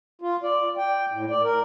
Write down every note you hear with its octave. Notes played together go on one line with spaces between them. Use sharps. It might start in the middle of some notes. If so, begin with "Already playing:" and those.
F4
D5
G5
A2
D5
A#4